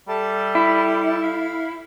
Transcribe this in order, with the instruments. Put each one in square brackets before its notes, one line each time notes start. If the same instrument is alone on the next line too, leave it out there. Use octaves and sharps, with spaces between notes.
[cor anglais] G3 [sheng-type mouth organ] A4 E5 A5
[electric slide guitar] E4
[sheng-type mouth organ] F5 B5